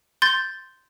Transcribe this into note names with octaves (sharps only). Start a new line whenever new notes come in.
C6 G6 A6